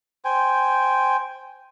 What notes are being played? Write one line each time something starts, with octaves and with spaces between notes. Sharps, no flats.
C5 G5 G#5